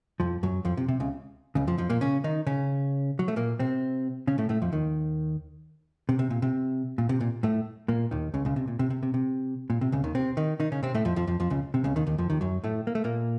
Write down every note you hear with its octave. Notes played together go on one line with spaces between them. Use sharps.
F2 F3
F#2 F#3
F2 F3
C3
C3
C#2 C#3
C#2 C#3
F2 F3
F2 F3
A#2 A#3
C#3 C#4
D#3 D#4
C#3 C#4
F#3
A3
A#2 A#3
C3 C4
C#3 C#4
A2 A3
A2 A3
F2 F3
D#2 D#3
C3
C3
A#2
C3
A#2
C3
A#2
A2 A3
A#2 A#3
D#2 D#3
C#2 C#3
C#2 C#3
C3
A#2
C3
C3
C3
C3
A#2
C3
C#2 C#3
D#2 D#3
C3 C4
D#3 D#4
D#3 D#4
C#3 C#4
C3 C4
A2 A3
F2 F3
F2 F3
F2 F3
F2 F3
C#2 C#3
C3
C#2 C#3
D#2 D#3
D#2 D#3
F2 F3
D#2 D#3
F#2 F#3
A2 A3
A#3
A3
A#2 A#3